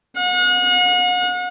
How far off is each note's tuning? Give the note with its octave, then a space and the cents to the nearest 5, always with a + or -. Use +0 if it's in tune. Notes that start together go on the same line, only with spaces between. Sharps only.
F#5 -40